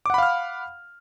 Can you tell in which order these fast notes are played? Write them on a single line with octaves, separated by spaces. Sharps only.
D6 F#5 B5 F5 F6